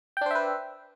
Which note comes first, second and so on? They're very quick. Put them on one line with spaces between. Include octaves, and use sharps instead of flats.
G5 D4 C5 E5 B4